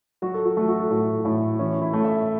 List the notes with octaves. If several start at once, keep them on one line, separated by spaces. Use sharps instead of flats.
F#3 F#4
A4
F#4
A3 A4
F#4
A4
A2 F#4
A2
E3 C#4
E4
A3
E5